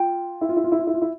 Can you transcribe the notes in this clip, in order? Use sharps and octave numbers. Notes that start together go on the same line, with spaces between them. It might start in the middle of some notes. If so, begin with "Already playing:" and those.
Already playing: F4 G5
E4
F4
E4
F4
E4
F4
E4
F4
E4